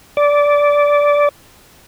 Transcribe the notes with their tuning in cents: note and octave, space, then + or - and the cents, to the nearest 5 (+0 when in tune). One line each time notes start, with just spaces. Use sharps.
D5 -15